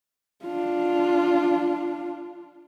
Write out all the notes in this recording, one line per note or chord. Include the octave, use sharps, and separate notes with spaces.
D4 F4